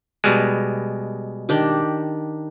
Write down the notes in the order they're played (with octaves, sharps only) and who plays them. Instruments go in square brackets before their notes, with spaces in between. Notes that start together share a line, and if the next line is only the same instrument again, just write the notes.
[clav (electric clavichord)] B2 G3 G#3
[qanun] D#3 D4 G4